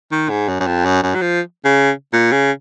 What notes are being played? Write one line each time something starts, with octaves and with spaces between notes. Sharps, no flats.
D#3
G#2
F#2
F#2
F2
F#2
F#2
F#3
F3
C#3
A#2
C#3